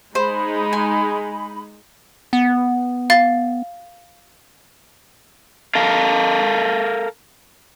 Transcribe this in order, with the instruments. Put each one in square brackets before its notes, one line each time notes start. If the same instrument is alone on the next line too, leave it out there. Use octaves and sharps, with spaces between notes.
[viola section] G#3 D#4 [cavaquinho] C5 [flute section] B5
[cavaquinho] G#5
[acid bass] B3
[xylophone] F5 A6
[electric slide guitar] A4 A#4 F5